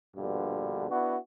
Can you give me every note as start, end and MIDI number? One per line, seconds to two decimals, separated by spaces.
0.17 0.89 34
0.17 0.89 43
0.17 0.89 47
0.17 0.89 50
0.89 1.16 59
0.89 1.16 62
0.89 1.16 64
0.89 1.16 66